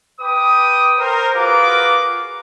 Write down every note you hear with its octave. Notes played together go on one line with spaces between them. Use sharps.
B4 G5 D6 D#6
A#4 C5
F4 F#4 G#4 A#4 B4 D6